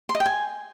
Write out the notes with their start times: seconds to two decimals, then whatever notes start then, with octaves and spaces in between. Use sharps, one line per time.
0.09 C6
0.15 D#5
0.20 G5
0.26 G#5